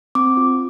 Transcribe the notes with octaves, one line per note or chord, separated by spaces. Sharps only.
C4 D6
F4